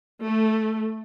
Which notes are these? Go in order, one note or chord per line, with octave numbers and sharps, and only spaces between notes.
A3